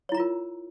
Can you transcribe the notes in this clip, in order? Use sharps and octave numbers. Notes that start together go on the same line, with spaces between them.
E4 F4 A#4 C#5 A#5